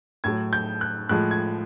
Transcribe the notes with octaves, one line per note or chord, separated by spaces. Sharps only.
A2 F#3 G#6
G6
F#6
A2 F3 G#3 F#6
G#6